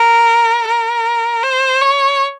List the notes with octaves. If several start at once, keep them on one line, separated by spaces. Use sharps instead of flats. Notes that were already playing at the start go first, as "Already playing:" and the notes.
Already playing: A#4
A#4
C5
C#5